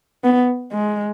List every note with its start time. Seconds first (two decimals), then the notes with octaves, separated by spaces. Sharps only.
0.24 B3
0.72 G#3